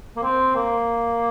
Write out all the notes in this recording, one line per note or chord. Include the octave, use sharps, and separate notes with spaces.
A#3
C4
A#3